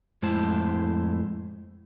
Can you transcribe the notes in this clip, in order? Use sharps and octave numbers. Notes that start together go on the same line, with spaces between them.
F2 A2 G#3 E4 C5 A5